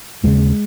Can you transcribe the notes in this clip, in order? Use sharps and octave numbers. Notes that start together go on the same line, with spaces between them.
D#2 C#3 G#3